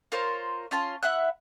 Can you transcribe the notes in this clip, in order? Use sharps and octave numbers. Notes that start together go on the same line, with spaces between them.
F4 A#4 C5 C#5
C#4 F4 A5 C6
E4 E5 F#5 F#6